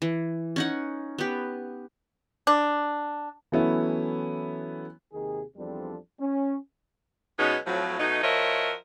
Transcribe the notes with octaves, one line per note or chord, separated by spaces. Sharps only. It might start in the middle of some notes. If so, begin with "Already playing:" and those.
E3
C#4 D#4 F#5
B3 G4
D4
E3 F#3 A3 B3 C#4 E4
D#2 C3 D#3 G#4
E2 F3 G3 C4 D4 A4
C#4
B2 F#3 G#3 B3 C#4 D#4
F2 A2 F3 F#3
B2 F#3 A3 D#4
F3 F#4 A#4 C#5 D#5 E5